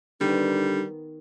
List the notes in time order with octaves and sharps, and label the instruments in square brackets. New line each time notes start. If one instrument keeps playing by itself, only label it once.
[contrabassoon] D3 [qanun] D#3 B3 [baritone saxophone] G3 [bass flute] D#4